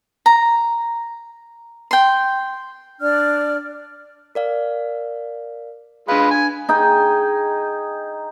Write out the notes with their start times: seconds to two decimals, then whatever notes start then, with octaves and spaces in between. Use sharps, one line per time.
0.26 A#5
1.91 G5 C6
3.00 D4 D5 F6
4.35 A#4 D5 F5
6.08 G#3 D4 F4 B4 F5
6.31 G#5
6.69 D#4 G#4 G5